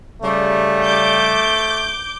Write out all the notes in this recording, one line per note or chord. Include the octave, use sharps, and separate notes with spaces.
C#3 G3 A3
D6 G6